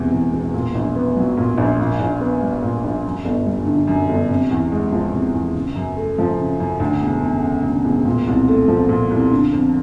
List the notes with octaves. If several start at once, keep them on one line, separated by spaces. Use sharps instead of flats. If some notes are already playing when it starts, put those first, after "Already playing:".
Already playing: E1 E2 C3 E3
E2
E1
A#2
A#1
B3
F#3
A#2
A#1
A#2
A#1
B3
G3
A#2
A#1
F#2
G1
G3
D3
F#2
G1
C3
E2
G#3
F3
C3
E2
C#3
F#2
A3
F3
C#3
F#2
D2
E1
E1
C#3
D2
E1
A#2
C2
A3
F3
A#2
C2
D3
F2